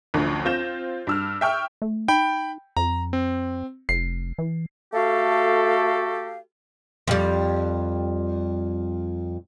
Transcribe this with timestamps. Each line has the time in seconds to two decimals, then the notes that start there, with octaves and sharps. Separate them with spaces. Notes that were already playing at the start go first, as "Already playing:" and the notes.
0.14 A1 D2 F3
0.45 C4 F4 G6 A#6 E7
1.07 G2 E6 F6
1.41 E5 G5 C#6 F6
1.82 A3
2.08 D#4 G5 B5
2.77 F2 A#5
3.13 C4
3.89 F1 C7
4.38 E3
4.93 A3 F#4 G4 A4 F5
7.08 F2 G3